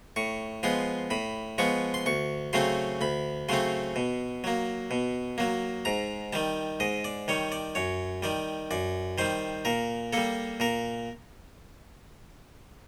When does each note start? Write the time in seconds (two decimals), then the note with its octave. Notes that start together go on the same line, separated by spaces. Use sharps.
0.16 A2 C#6
0.63 F3 G#3 B3 C6
1.10 A2 B5
1.58 F3 G#3 B3 C#6
1.94 C6
2.06 D2 C#6
2.53 C#3 F#3 A3 C4 C6
3.01 D2 B5
3.49 C#3 F#3 A3 C4 C6
3.96 B2
4.44 F#3 A#3
4.91 B2
5.38 F#3 A#3
5.85 G#2 A#5
6.33 D#3 G3 A5
6.80 G#2 D#5
7.04 D5
7.28 D#3 G3 C#5
7.52 D5
7.75 F#2 C#5
8.23 D#3 G3 D5
8.71 F#2 D5
9.18 D#3 G3 C5
9.65 A#2 A#4
10.13 G3 A#3 A4
10.60 A#2 A#4